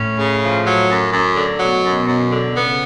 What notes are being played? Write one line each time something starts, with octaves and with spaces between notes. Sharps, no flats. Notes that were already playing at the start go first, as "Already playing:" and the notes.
Already playing: A2 C#4
C#3
F3
F#3
F#2
F#2
D3
B2 F#3
F#2
F#2
D3
C#3 B3